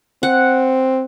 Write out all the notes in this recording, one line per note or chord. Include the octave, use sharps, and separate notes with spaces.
C4 F#5